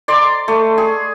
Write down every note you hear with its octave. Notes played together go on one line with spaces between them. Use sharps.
D5 A#5 C6 D6
A3
G#4